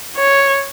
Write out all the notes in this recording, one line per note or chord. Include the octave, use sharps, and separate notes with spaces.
C#5